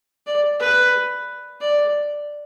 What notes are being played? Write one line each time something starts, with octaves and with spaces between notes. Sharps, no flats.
D5
B4
D5